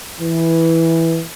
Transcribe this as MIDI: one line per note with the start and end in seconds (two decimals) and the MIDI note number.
0.21 1.23 52